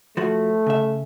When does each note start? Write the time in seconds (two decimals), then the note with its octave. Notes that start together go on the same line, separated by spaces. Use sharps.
0.17 F3 A3 F#4
0.67 C#3 E5